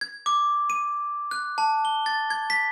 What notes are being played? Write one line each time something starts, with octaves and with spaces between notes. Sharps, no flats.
G#6
D6
D#7
F#6
A5
G7
A6
G#6
B6